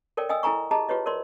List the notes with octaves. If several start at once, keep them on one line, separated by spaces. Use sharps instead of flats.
A4 A#4 C#5 D5 G5
D#5 G5 G#5 D#6 E6
E4 A4 G#5 A#5 C#6
G4 G#4 D#5 A5 A#5
F4 G4 B4 C#5 D#5
A#4 C#5 D5 C6